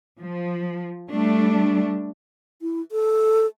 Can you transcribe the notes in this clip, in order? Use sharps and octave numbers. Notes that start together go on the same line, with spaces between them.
F3
G3 A3 D4
E4
A4